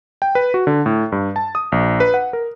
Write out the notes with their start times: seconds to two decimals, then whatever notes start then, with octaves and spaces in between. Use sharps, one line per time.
0.22 G5
0.35 B4
0.54 F#4
0.67 D3
0.86 A2
1.12 G2
1.36 A5
1.55 D#6
1.72 A#1
2.00 B4
2.14 F#5
2.33 A#4